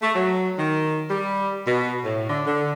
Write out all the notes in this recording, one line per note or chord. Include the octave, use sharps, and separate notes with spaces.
A3
F#3
D#3
G3
B2
A2
D3
D3